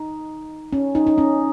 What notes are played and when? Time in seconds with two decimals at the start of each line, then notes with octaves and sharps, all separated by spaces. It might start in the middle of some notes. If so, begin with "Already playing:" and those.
Already playing: D#4
0.73 C#4
0.95 D#4
1.07 D#4
1.18 C#4